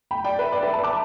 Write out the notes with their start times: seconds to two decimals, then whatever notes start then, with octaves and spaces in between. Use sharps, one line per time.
0.11 G5 B5
0.25 D5 G5
0.39 B4 E5
0.52 D5
0.63 B4 E5
0.73 E5 A5
0.84 A5 D6